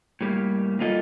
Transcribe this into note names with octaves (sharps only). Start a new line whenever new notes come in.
A2 G3 A#3
G3 A#3 F4 A4 D#5